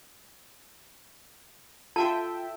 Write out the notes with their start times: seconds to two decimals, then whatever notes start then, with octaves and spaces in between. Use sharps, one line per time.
1.96 F4 F#4 A4 E5 G5 A5